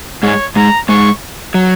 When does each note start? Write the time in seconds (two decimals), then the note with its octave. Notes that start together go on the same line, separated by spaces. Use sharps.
0.23 G#2 G#3 C#5
0.56 G#2 G#3 A#5
0.89 G#2 G#3 C#6
1.54 F#3